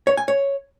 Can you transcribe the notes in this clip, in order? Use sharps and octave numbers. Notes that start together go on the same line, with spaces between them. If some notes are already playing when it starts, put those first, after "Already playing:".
C#5
G#5
C#5